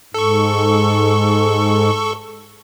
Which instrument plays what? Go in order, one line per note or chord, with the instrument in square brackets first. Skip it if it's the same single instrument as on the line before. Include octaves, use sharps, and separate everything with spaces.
[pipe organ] G#2 [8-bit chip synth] A4 C#6